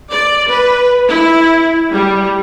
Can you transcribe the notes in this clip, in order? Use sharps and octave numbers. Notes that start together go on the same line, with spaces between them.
D5
B4
E4
G3